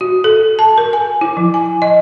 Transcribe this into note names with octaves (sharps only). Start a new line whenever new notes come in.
F#4
A4
A5
A#4
G#5
E4
F3
G#5
D#5